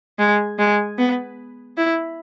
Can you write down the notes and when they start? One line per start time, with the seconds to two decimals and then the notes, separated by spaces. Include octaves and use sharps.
0.19 G#3
0.59 G#3
0.98 B3
1.77 E4